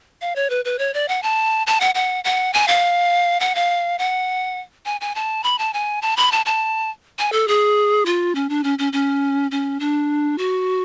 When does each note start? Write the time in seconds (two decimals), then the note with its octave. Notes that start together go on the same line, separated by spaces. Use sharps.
0.21 F5
0.36 C#5
0.50 B4
0.65 B4
0.79 C#5
0.94 D5
1.08 F#5
1.23 A5
1.67 A5
1.80 F#5
1.95 F#5
2.24 F#5
2.53 G#5
2.68 F5
3.40 F#5
3.55 F5
3.99 F#5
4.86 G#5
5.01 G#5
5.15 A5
5.44 B5
5.59 A5
5.74 G#5
6.02 A5
6.17 B5
6.32 A5
6.46 A5
7.19 G#5
7.32 A4
7.48 G#4
8.06 F4
8.35 C#4
8.49 D4
8.64 C#4
8.79 C#4
8.93 C#4
9.51 C#4
9.80 D4
10.38 F#4